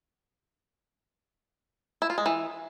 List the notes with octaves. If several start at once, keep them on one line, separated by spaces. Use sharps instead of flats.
E4
F4
G#3
E3